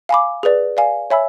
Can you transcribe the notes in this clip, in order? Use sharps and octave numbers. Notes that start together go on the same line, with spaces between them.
F5 G#5 B5 D6
G#4 B4 D5
D5 F5 G#5
C#5 E5 G#5 B5 E6